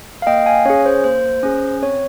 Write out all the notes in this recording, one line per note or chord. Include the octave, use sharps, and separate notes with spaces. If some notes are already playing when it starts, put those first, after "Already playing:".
F5
A#3 D#5 G5
F5 G#5
C#4 G#4 C#5
C5
A#3 C5
C#4 G#4
C4 C#5